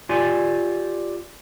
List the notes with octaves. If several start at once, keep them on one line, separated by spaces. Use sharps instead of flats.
F4 G4 D5 G#5